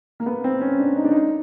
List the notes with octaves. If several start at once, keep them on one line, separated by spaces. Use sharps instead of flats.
A#3
B3
C4
C#4
D4
D#4
D4
D#4